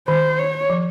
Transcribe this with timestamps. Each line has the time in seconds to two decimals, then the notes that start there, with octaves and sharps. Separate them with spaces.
0.08 D#3 C5
0.39 C#5
0.70 F3